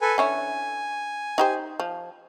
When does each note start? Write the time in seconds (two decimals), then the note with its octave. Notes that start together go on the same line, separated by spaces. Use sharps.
0.02 A4 B4 G#5
0.18 D3 C#4 E4 G#5
1.38 D#4 G4 C5
1.80 F3